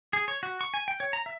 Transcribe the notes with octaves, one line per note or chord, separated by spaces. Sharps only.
G#4
C#5
F#4
C#6
G#5
G5
C#5
A#5
E5